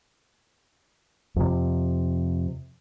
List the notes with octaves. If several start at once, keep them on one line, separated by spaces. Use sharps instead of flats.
F2 C3